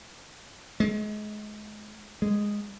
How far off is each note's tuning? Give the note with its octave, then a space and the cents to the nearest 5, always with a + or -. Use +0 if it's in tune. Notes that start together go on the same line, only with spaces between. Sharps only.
G#3 +30
G#3 -5